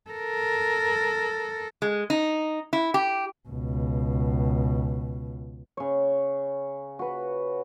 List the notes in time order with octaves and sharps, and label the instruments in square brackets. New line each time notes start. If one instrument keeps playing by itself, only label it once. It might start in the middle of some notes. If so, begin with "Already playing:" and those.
[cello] A4 A#4
[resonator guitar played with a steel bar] G#3
D#4
E4
G4
[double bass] C#2 B2
[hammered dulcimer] C#3 C#5
F#4 B4